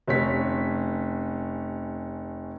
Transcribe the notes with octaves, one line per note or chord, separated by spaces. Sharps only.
F1 C#4 B6